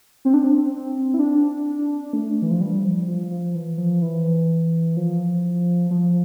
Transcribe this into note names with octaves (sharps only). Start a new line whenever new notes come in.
C4
D4
C4
E4
D4
A3
E3
F3
G3
F3
F3
F3
E3
F3
E3
F3
F3